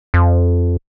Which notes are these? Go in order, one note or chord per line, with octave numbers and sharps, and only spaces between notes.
F2